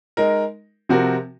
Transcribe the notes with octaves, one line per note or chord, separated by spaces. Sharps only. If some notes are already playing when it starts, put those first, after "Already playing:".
G#3 D#4 A#4
C3 F3 C4 F#4 A#4